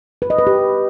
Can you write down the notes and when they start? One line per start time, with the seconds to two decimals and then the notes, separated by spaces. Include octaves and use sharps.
0.22 B4
0.30 D#5
0.38 B4
0.47 G4